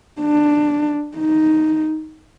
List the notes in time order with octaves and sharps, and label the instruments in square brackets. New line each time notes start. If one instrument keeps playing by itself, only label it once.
[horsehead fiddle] D4
D#4